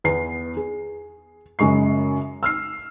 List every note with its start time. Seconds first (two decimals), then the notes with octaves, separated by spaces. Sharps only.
0.04 E2 B3 C7
0.57 G#4
1.59 F#2 C#3 G#3 C#6 C7
2.43 E6 F6 C7